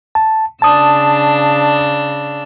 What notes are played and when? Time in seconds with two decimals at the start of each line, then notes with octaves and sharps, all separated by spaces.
0.15 A5
0.62 C#3 D4 A5 D#6 E6